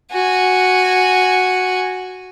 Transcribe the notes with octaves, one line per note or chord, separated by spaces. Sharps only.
F#4 G#5